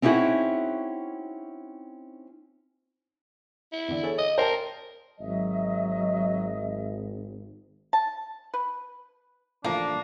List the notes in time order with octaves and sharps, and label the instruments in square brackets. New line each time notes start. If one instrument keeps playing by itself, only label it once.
[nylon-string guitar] C4 C#4 D#4 E4 F#4 G#4
[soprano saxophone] E4
[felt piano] E2 D3
G#4 A4 C#5
[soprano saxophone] D#5 [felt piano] D#6
[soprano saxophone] A#4 [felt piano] C5 G5 A5
[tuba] G#1 [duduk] F#3 [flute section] D#5 E5
[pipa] A5
B4
[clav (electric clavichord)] A1 D3 F3 [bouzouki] A#3 [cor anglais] D4